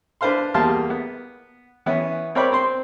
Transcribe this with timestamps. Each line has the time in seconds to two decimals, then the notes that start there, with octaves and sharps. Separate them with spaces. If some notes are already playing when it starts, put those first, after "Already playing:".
0.21 D4 B4 C5 F5 C6
0.54 E2 G3 A#3 F5 A5 C6
0.90 B3
1.86 E3 B3 C#4 E4
2.35 C4 A#4 C#5 D5 G5 B5
2.52 C4 C5 C6